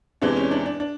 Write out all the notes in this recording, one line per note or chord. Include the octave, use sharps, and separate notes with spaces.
E2 C3 E3 G#3 D4
C#4
D4
D4
D4